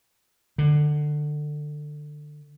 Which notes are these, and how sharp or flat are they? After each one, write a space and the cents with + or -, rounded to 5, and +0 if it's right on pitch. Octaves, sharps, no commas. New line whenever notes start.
D3 +20